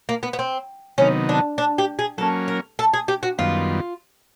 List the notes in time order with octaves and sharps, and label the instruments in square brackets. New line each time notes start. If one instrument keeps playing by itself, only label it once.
[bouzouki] A#3
B3
B3
C4
[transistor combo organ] C3 D#3 F#3 B3 D#4 [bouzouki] C#4
[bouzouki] D4
D4
G4
G#4
[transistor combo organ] F#3 A#3 C#4 [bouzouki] A4
[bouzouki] A#4
A4
G#4
G4
F#4
[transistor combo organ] F#2 D#3 G3 B3 [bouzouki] F4